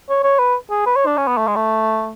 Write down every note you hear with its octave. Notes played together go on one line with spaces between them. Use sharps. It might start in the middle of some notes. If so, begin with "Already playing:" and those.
C#5
C#5
B4
G#4
B4
C#5
D4
C#4
B3
A3
G#3
A3